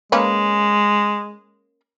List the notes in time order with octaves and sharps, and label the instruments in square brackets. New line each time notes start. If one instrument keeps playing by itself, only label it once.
[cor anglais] G#3 [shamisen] A#3 C#4 B4